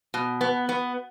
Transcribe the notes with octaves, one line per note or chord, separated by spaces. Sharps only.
B2
B3
B3